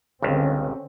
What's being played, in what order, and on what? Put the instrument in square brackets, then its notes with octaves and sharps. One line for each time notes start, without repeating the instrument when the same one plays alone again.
[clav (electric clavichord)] G1 C#2 G2 [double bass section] D3 C4 C#4